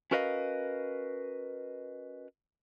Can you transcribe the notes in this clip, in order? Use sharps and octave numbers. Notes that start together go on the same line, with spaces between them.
C#4 F#4 A#4 B4 D#5 F5